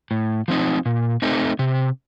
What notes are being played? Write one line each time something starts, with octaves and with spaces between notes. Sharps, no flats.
A2
F3 C4 D#4
A#2
A3 C4 D#4
C3